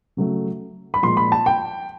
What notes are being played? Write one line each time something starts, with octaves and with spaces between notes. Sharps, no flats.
C#3 F#3 A3
B5
A#2 F3 G#3 C6
B5
A5
G5